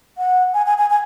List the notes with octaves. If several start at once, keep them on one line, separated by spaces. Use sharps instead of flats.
F#5
G#5
G#5
G#5
G#5